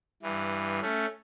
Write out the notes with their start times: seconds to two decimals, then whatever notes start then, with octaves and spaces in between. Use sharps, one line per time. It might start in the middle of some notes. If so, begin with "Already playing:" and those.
0.23 G2 E3
0.82 A3 C#4